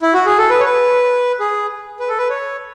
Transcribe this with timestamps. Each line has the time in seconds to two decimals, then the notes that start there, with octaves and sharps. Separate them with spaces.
0.02 E4
0.14 F#4
0.26 G#4
0.38 A4
0.50 B4
0.60 C#5
0.65 B4
1.40 G#4
1.99 B4
2.09 A4
2.18 B4
2.30 C#5